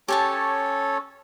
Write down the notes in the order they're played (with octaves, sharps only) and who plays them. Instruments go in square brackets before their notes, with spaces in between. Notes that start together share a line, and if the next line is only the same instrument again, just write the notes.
[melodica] C#4 A4 C#5 [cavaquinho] G4 G#5 A5